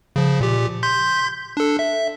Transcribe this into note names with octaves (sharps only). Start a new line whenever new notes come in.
C#3 F3
A#2 G4
C6 G6 B6
D4 A4
E5